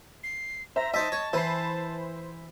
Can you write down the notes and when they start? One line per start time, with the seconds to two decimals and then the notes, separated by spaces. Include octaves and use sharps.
0.24 C7
0.76 C5 E5 A#5
0.94 D#4 C5 D#5 E5 A5
1.12 C#5
1.33 E3 C5 B5 C7